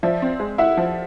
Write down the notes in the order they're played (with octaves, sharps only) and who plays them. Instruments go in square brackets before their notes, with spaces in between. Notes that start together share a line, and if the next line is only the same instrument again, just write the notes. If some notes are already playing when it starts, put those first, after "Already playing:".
[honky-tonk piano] F3 [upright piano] D5 E5
[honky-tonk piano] C4
G#3
[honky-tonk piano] E4 [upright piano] E5 F#5
[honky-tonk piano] F3